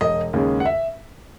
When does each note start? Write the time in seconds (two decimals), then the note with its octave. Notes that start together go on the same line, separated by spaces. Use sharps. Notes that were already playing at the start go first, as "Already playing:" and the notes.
0.01 E1 D#5
0.33 D#2 C#3 G#3 C#4
0.60 F#5
0.65 E5